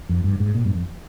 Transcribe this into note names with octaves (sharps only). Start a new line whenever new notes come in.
F2
G2
G#2
A#2
G2
F2